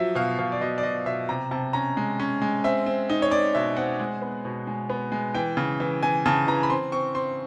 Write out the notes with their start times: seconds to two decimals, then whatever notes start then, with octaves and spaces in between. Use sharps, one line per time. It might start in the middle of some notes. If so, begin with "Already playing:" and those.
Already playing: F3 F#3 E5
0.15 B2 F5
0.38 B2 F5
0.52 D5
0.61 B2 D#5
0.78 D5
0.83 B2 D#5
1.06 B2 E5
1.29 C3 A#5
1.51 C3 A5
1.73 C#4 A#5
1.97 G#3
2.20 C#4
2.42 G#3
2.64 C4 E5
2.86 C4
3.09 D#4
3.22 C#5
3.31 C4 D5
3.55 B2 E5
3.77 C4 F#5
4.00 G#3
4.22 B3
4.45 B2
4.67 G#3
4.90 B3
5.12 G#3
5.34 E3 G5
5.57 C#3
5.80 E3
6.03 E3 G#5
6.26 C#3 A5
6.48 E3 A#5
6.63 B5
6.70 C4 C6
6.92 C4 C#6
7.15 C4 C6